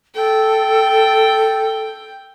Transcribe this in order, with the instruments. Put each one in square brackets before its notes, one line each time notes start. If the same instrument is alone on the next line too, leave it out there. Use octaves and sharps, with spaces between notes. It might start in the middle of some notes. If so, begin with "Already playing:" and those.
[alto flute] A4 [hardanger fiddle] G5